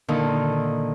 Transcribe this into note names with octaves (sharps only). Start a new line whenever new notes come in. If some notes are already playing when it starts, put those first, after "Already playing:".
A#2 D3 D#3 D#4